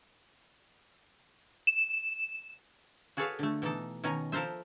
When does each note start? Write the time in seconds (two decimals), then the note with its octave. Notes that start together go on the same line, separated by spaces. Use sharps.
1.67 E7
3.17 F#4 G#4 A4 B4 C#5 F5
3.39 D3 A3
3.62 B2 E3 D#4 A4
4.04 B2 D#3 C#4 G#5 A#5
4.32 F3 A4 A#4 C5 E5